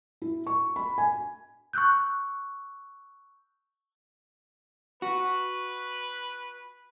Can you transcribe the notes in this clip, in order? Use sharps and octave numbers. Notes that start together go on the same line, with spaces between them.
E4
C#6
B5
G#5
C#6 E6 F#6 G6
F#4 B4